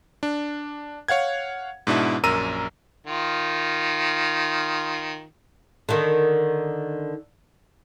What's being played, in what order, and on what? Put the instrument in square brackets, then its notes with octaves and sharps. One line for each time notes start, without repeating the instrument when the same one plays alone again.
[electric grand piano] D4
C#5 F5 F#5 G#6
G#2 B2 D4 E4
A#1 F#2 A#4 A#5 E6 D#7
[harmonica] D#3 F4
[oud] D3 D#3